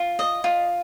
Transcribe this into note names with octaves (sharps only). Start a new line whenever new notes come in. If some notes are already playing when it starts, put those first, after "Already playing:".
Already playing: F4
D#5
F4